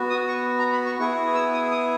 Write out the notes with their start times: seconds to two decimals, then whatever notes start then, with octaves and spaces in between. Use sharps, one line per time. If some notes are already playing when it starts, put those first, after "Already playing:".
Already playing: B3 F#4
0.10 D#6
0.28 C#6
0.59 A#5
0.72 B5
0.86 C#6
0.99 B3 E4 G#4 C#6
1.34 E6
1.53 D#6
1.71 D#6